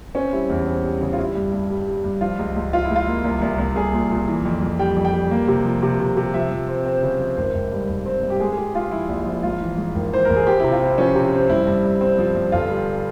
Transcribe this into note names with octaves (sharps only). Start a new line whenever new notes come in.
C4 C#4
G3 E4
E2 E4
C4
G3
C#3
F4
G3 E4
G2
G2
G3
G3
G2
F3 F4
C#2
C#2
F3 F4
E4
C#2
F4
A#3
C2
C2
C2
C2 G#4
A#2
A#2
E3
F2
F2
G3 G5
F2
G5
G3
A#3
C3
F3
C3
C3
C3
F3 E5
F3
C4
C4
C#3
F3
G#1 C5
G#1
G2
G#1
C4
G2
G4
G#3 G#4
G#4
G#3 G4
G#3 F4
F3 E4
A#1
F3
G#2 F4
E3
G#2
G#1
E3 C5
G#1 A#4
G#4
C4 G4
C3 E4
F4
C4 E4
F3 C#4
C3
C4
G2 E4
G2
G2
C4
F3
G2
G1 F4
G3